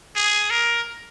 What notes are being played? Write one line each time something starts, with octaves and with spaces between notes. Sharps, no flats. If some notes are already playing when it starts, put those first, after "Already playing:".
G#4
A#4